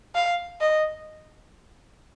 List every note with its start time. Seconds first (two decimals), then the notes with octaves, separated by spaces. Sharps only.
0.15 F5
0.61 D#5